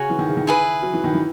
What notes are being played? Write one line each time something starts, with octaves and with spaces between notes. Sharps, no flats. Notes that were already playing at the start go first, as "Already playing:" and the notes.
Already playing: C#3 F#4 C#5 G#5 C#6
E3
D#3
C#3
D#3
E4 G#4 B4
F#3
E3
D#3
E3